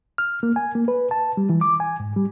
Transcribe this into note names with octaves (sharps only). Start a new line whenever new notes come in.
F6
A#3
G#5
A#3
B4
A5
G3
E3
D6
G#5
G#2
G3